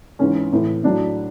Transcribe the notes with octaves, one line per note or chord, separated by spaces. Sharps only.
G#2 E3 C#4
A2 E3
A2 F#3 D4